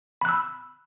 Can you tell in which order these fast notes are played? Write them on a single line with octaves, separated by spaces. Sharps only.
B5 F#6 E6